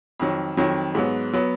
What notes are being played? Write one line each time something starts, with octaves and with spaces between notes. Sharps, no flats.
F2 D#3 F#3
F2 D#3 F#3
G#2 F#3 B3
F#3 B3